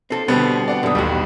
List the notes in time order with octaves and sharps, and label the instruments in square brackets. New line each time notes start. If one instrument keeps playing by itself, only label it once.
[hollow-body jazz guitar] C4 A4
[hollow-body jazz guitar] B2 C4 [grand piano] D3 G3 B3
[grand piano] D5 F#5
[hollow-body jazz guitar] F#2 B2 [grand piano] D3 D#6
[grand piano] A1 D#2 [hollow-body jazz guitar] G3 F#4